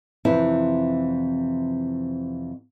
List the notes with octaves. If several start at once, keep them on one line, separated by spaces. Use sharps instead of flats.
F2 C3 E3 E4